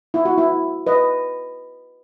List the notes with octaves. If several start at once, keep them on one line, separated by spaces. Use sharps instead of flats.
E4
F#4
E4
B4 D#5